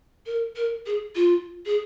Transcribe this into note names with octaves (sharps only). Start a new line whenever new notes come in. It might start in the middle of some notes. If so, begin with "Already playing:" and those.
A#4
A#4
G#4
F4
G#4